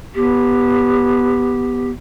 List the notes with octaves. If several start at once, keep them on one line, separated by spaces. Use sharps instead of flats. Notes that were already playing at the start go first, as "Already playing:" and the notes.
B3 G4